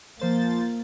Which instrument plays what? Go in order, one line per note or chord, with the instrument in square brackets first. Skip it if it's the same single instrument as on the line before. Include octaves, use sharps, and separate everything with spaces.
[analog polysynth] F3 C5 A6 [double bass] A#3